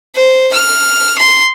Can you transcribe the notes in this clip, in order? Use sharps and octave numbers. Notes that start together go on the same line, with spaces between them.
C5
F6
C6